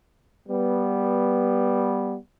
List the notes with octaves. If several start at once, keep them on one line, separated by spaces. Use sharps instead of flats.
G3 B3